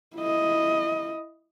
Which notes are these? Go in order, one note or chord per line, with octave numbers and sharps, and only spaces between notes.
E4 D#5